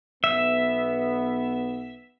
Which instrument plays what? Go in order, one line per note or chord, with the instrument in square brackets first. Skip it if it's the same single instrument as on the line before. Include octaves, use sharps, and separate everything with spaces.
[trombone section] B1 B3 [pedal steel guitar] E5